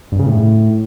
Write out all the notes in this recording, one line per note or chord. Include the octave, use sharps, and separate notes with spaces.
G2
C#3
A2